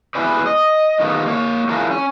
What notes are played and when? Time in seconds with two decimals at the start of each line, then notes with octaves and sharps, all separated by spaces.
0.15 B3 E4 F#4 G#4 B4 D5
0.46 D#5
1.00 D#3 A3 B3 D#4 F4
1.26 A#3 C#5
1.69 E3 F#3 D4 F4 G#4 A#4
1.91 C#4